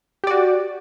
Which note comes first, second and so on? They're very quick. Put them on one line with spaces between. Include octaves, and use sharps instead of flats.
G4 D5 F#4